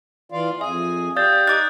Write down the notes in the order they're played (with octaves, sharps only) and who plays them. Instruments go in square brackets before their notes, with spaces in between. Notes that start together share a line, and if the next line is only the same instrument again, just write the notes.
[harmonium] E3 D5 F5 [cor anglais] F4
[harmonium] F2 G#5 [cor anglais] G#4 [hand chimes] E5
[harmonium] G4 F5 [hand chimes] D5 [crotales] D#6 G6 A6
[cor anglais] D#4 [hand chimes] D6 A6 [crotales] F#6